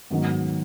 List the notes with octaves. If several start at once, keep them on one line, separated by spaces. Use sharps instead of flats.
G#2 D#3 F#3 B3